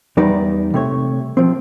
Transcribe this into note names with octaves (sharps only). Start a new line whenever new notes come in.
E2 G3 D#4 B4 D5
C3 A3 C#5
F3 C4